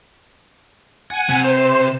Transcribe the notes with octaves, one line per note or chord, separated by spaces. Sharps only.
F#5 G#5
C3
C5